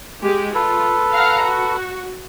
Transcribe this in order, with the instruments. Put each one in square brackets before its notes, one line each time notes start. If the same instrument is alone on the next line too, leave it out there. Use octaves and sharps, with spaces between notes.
[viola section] G#3 G4
[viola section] F4 [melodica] A4 B4
[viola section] F5 F#5 A#5
F#4